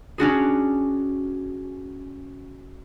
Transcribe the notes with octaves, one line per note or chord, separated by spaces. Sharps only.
C#4 D4 F#4 G#4